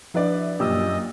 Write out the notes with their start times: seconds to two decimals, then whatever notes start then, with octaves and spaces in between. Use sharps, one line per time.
0.14 F3 D4 E4 B4 D5
0.60 F#2 A#2 G4 D#5 E6